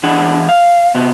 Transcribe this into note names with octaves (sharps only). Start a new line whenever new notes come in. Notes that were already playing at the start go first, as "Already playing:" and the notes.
E2 E3 D4 G#4 F#5
F5
C3 B3